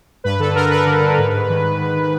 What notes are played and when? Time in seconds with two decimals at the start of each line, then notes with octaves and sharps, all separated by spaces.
0.24 G2 B4
0.39 D3 A4
0.55 D3 A#4
0.70 D3 B4
0.86 D3
1.02 D3
1.18 G#2
1.33 G#2
1.50 D#3
1.64 D#3
1.80 D#3
1.96 D#3